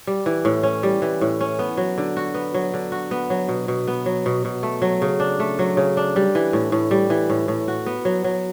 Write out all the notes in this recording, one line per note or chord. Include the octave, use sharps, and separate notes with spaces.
G3
E3
A2
C#4
G3
E3
A2
C#4
B3
F#3
D3
F#4
B3
F#3
D3
F#4
B3
F#3
B2
B2
B3
F#3
B2
B2
A3
F#3
C#3
D4
A3
F#3
C#3
D4
G3
E3
A2
A2
G3
E3
A2
A2
F#4
B3
F#3
F#3